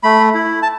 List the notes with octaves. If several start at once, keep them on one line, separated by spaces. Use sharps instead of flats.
A3 B5
E4
A5